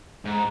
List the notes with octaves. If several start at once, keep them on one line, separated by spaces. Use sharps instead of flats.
G#2